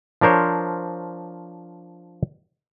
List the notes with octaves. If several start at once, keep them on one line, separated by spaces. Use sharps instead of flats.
F3 D4 A#4 C5 C#5